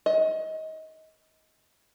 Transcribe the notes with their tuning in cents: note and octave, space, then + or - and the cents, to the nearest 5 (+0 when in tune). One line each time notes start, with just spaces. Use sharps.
D#5 +25